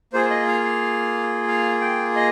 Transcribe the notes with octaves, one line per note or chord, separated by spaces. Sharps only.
A#3 F4 G#4 C5
D#5
F5
F5
F5
G5
D#5